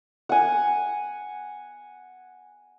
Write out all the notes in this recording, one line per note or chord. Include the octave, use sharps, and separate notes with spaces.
F#5 G#5